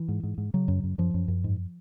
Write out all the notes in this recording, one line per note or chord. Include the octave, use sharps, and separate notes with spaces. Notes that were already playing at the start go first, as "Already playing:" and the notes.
Already playing: E3
G#2
G#2
G#2
C#3 F#3
F#2
F#2
F#2 F3
F#2
F#2
G#2